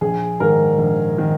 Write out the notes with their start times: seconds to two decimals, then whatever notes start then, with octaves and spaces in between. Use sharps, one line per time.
0.01 A#1 G#4
0.40 G#2 D#3 A#4
0.78 A#1
1.18 D#3